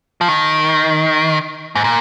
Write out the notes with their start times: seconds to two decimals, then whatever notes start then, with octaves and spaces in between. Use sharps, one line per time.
0.21 F3
0.28 D#3
1.75 G#2
1.84 A#2